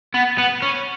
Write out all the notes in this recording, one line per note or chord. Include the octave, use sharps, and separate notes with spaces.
B3
B3
C#4